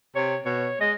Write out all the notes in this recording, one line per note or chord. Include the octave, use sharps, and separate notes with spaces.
C3 C#5
B2 C#5
G#3 D#5